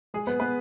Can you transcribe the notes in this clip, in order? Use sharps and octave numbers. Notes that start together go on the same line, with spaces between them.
G#3 G#4
B3 B4
B3 B4